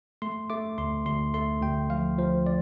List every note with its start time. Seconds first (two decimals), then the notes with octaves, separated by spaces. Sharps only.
0.22 A3 C6
0.50 A3 D6
0.78 D2 C6
1.06 D2 C6
1.34 A3 C6
1.62 D2 G5
1.90 F3 F5
2.18 F3 C5
2.46 D5